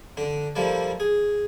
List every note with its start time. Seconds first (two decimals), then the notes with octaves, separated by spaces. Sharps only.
0.17 D3 D4
0.56 F3 G3 A#3 E4 A4 D5
1.00 G#4